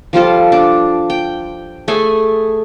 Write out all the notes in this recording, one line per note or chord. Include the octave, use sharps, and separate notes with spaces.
F3 G3 F4 A4
D4
G5
A3 G#4 A4 G#5